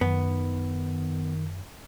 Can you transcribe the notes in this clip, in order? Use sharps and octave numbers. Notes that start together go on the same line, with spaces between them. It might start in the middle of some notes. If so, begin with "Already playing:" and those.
F#2 D#3 B3